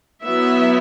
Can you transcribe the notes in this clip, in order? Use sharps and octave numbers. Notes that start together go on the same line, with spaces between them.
F#3 B3 E4 E5